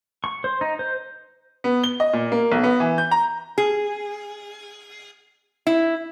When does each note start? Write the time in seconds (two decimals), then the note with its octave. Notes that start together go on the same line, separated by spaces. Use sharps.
0.24 C#6
0.44 C5
0.61 D#4
0.79 C5
1.64 B3
1.84 G7
2.00 D#5
2.13 A#2
2.32 A#3
2.52 B1
2.63 B3
2.80 E3
2.98 G6
3.11 A#5
3.58 G#4
5.67 E4